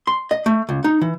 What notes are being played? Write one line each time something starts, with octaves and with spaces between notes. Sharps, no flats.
C6
D#5
A3
C#2
D#4
E3